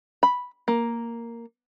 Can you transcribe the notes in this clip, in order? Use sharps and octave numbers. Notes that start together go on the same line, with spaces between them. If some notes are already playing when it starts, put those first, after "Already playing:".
B5
A#3